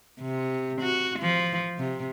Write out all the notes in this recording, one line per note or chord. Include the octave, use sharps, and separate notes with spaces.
C3
F#4
F3
C3